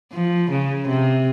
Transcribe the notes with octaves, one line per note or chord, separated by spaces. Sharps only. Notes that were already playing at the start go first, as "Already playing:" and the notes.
F3
C#3
C3